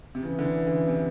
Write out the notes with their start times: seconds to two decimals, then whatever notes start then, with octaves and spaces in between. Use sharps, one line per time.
0.15 C3
0.22 C#3 E3
0.39 D3
0.67 D3
0.70 C#3
0.87 C3